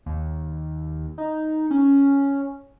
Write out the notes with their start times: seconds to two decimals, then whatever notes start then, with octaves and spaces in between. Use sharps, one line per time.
0.06 D#2
1.18 D#4
1.71 C#4